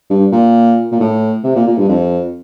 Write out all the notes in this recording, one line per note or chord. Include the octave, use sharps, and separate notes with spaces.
G2
A#2
A#2
A2
C3
A#2
A#2
G2
F2